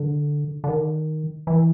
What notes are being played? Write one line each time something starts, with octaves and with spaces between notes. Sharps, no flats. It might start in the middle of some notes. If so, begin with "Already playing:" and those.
Already playing: D3
D3
D#3
E3